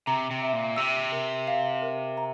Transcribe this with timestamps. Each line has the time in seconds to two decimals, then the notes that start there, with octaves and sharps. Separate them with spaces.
0.07 C3 A#5
0.31 C3
0.42 E5
0.53 A#2
0.76 C3 E6
1.12 A#4
1.47 F5
1.82 A#4
2.17 A#5